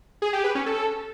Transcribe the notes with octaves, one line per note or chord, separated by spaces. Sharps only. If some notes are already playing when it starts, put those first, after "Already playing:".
G#4
G4
B4
C#4
A4